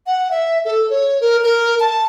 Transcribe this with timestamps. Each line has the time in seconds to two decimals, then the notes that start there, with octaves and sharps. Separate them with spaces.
0.07 F#5
0.31 E5
0.65 A4
0.90 C#5
1.21 A#4
1.44 A#4
1.80 A5